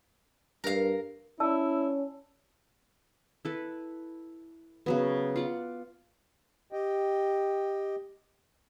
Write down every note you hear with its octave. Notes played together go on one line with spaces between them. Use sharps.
G2 A#4 F5
C#4 E4 D5 A5 E6
E4 A4 B4
C#3 F#3 B3
F4 D5 F#5
G4 D#5 G5